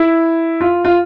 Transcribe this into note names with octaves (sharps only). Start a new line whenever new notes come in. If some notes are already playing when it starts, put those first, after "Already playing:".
Already playing: E4
F4
F4